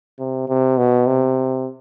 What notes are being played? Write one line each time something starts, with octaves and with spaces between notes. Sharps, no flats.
C3
C3
B2
C3